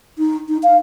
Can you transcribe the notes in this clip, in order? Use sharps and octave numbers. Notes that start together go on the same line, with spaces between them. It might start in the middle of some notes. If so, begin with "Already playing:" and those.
D#4
D#4
F5